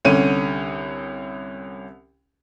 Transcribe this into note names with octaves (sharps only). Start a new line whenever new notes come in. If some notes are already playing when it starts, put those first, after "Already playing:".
C2 D3 C#4 D#7